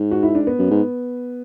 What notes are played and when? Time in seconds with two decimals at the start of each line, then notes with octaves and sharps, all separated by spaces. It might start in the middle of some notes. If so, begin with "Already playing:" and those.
Already playing: G#2
0.11 F#4
0.23 E4
0.35 D4
0.47 B3
0.59 F#2
0.71 G#2